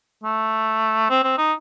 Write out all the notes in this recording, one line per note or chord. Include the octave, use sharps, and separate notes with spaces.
A3
C4
C4
D#4